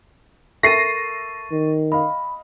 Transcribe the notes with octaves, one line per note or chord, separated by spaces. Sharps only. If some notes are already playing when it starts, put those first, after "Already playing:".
A4 A#4 E5 C#6 A6 A#6 C7 D#7
D#3
D#5 F5 B5